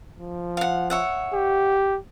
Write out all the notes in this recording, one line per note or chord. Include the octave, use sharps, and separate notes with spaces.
F3
F5 F#5
C#5 E5 F#5
G4